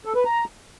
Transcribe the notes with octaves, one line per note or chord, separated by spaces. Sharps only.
A4
B4
A#5